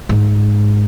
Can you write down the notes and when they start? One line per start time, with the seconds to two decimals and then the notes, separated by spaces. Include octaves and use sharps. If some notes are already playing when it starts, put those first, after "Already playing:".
0.09 G#2